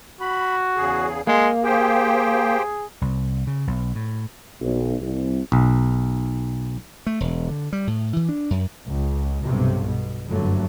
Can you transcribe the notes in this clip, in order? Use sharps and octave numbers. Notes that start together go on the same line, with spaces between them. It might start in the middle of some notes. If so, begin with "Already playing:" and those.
F#4 B5
E2 C#3 G#4
G#3 A#3 C6
G4 G#4 C5 G5
C2
C#3
B1
A2
B1
C2
B1
A3
E1
D3
G3
A2
E3
D4
F#2
C#2
B1 G2 C3
B2
F#1 G2 D3 F#3 A3